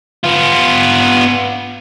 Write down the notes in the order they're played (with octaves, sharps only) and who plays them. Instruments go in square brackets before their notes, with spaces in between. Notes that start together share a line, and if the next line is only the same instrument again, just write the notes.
[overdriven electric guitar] B3 F4